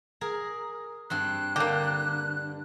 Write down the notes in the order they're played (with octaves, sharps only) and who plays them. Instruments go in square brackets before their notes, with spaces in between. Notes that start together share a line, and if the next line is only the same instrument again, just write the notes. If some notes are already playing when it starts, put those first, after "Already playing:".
[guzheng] G#4 A#4
[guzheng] G2 C4 C6 [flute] F#6
[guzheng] D3 [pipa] A#3 G4